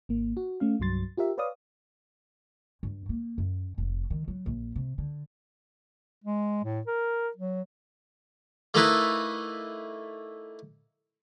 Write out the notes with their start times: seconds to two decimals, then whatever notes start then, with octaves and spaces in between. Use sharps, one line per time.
0.09 G#1 A#3
0.37 F#4
0.60 A3 C#4 F5
0.80 C2 G2 F#3 C6 A6
1.17 F4 G4 A#4 E5
1.38 B4 C#5 D5 F5 D#6
2.83 G2
3.09 A#3
3.38 F#2
3.78 F1
4.10 D#3
4.28 F#3
4.46 A#1
4.76 C3
4.98 D3
6.24 G#3
6.64 A2
6.87 A#4
7.37 F#3
8.74 A3 A#3 D#4 E4 A4 B4